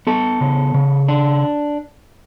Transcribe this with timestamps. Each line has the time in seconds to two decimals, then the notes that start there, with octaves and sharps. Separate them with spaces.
0.07 B3 A4
0.41 C#3
0.74 C#3
1.09 D4